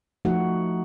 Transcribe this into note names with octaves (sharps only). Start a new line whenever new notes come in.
F3 A3 D#4 F#4 F#5